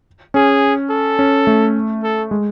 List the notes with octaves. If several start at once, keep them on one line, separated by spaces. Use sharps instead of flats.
C#4 G#4
A4
C#4
A3
A4
G#3